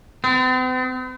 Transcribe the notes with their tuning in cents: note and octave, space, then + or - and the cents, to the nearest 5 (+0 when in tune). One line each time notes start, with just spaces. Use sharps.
C4 -45